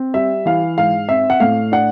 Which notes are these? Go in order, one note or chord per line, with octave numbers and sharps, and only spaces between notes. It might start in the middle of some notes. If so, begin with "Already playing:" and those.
Already playing: C4
G3 E5
E3 F5
G#2 F5
C4 E5
F#5
A2 F5
D4 F#5